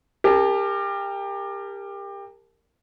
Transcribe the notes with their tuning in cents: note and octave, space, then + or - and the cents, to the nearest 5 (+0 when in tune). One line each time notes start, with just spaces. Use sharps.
G4 +25 A#4 -15 A5 -35